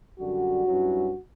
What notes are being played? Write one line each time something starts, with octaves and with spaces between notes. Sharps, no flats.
F#2 D3 G3 F#4
G2 F#3 C#4 E4